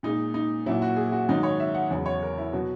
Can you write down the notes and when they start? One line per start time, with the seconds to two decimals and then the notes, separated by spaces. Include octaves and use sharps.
0.03 A#2 G#3 D#4
0.34 D#4
0.66 A#2 F#3 E4
0.82 F#4
0.96 G#4
1.12 F#4
1.29 G#2 D#3 F#3 D#4
1.43 C#5
1.60 E5
1.74 F#5
1.90 E2 C#3 F#3
2.06 C#5
2.22 A#4
2.38 E4
2.53 B2 F#3 F#4